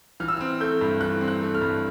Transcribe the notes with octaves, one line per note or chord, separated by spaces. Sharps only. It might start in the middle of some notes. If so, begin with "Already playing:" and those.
E3 F6
E6
C4 F6
A3 G6
G2
E3 F#6
C4
F#6
A3
F6
G2